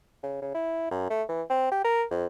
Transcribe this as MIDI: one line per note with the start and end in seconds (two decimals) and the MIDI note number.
0.23 0.41 49
0.42 0.52 49
0.54 0.91 64
0.91 1.08 42
1.10 1.23 57
1.28 1.42 52
1.50 1.69 60
1.71 1.81 67
1.84 2.04 70
2.11 2.26 41